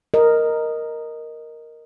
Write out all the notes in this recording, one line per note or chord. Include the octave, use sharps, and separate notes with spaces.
A#4 D#5